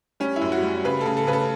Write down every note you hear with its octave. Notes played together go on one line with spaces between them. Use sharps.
G3 C#4
E4
F#2
F#4
G3
C#3 B4
A4
C#3
A4
C#3 B4
A4